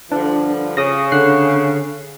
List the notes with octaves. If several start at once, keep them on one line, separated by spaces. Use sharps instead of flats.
G2 D3 F3 D4
C#3 D#6 A#6
D3 F#6 C7